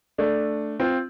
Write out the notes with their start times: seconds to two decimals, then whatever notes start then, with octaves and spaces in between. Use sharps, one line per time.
0.18 A3 D4
0.80 C4 F4